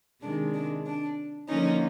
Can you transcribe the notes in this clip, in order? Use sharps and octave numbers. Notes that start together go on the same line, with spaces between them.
C3 D#3 G#3 D4
D4
D4
D3 F3 A#3 C#4 D#4